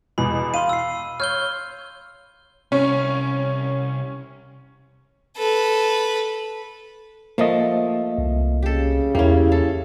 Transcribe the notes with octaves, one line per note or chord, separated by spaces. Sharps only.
E2 B2 B5
F5 C6 D#7
E6 C7
C#5 F6 G6 G7
C2 C#4
A4 B4
F3 A3 A#3 D#5
C2
C#3 G4 A4
E2 A#3 C#4 E4 G4
A4